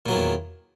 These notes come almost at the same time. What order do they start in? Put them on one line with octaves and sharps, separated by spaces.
A#2 F#3 D#3 E2